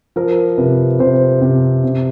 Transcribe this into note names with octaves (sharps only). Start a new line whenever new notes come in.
F3 A#4
C3 B4
C3 C5
C3
C3